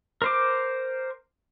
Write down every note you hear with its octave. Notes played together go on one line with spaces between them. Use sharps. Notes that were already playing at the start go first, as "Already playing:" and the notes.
A#4 C5 D6